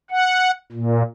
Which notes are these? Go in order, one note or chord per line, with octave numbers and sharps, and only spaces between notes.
F#5
A#2